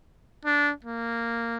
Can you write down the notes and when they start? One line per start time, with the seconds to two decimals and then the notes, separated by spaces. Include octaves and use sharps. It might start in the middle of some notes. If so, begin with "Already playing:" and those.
0.45 D4
0.85 A#3